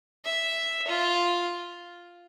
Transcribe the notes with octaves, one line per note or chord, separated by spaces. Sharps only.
E5
F4